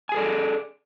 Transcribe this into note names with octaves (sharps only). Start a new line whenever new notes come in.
G#4 A4 D5 G#5